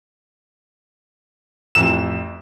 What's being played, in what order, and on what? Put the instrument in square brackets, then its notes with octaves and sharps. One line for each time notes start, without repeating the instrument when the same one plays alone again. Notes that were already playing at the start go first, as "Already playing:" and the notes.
[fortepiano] A1 F2 E6 [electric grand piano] E7